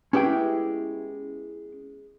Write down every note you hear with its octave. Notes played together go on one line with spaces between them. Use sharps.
G#3 B3 C#4 E4 G4 G5